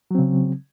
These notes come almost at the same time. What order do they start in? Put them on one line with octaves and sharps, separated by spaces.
F#3 C4 C#3